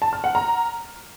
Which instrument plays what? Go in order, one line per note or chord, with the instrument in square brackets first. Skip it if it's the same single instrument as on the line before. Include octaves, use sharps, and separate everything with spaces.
[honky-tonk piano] A5
F6
F#5
A#5